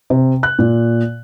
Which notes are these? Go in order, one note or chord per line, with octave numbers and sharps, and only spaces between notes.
C3
F#6
A#2